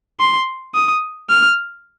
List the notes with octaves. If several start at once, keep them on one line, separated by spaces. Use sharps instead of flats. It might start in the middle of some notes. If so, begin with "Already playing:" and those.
C6
D#6
F6